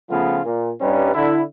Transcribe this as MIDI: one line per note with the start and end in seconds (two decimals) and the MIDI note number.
0.10 0.40 49
0.10 0.40 53
0.10 0.40 57
0.10 0.40 59
0.10 0.40 65
0.46 0.71 46
0.81 1.14 43
0.81 1.14 55
0.81 1.14 61
0.81 1.14 63
0.81 1.14 71
1.15 1.41 50
1.15 1.41 64